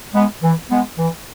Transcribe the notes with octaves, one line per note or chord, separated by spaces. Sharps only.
G#3 B3
E3
G#3 B3
E3